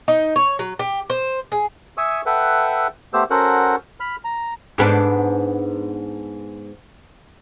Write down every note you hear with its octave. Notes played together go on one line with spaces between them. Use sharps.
D#4
C#5
F#3
G4
C5
G#4
E5 G#5 C#6 D#6 E6
A4 B4 E5 F#5 G5
A3 B3 G4 C5 E6
C#4 F#4 A4 A#4 C5 F#5
B5 F6
A#5
G#2 B3 D4